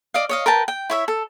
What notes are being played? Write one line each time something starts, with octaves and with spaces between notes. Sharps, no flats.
D5 D#5 F5
C#5 D#5 F5
A#4 B4 G5 A5
G5
E4 C#5 E5
A4